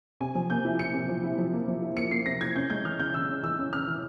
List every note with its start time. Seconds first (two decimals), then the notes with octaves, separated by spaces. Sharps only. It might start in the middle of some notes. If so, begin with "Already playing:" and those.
0.21 C3 G#5
0.35 F3
0.50 A#3 G6
0.65 E4
0.79 E4 C#7
0.94 C3
1.09 F3
1.23 E4
1.38 F3
1.53 A#3
1.68 F3
1.82 E4
1.97 A#3 C#7
2.11 A#3 C7
2.26 C3 A#6
2.41 E4 G#6
2.55 C#4 G6
2.70 G#3 G6
2.85 E3 F6
2.99 C#3 G6
3.14 E3 E6
3.29 C#4
3.44 E3 E6
3.58 C#4
3.73 C#4 F6
3.87 E3